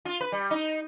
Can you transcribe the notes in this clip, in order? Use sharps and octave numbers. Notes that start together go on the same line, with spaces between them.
F4
B4
G3
D#4